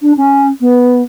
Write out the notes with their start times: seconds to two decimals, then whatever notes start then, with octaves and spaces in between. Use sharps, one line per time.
0.02 D4
0.17 C#4
0.60 B3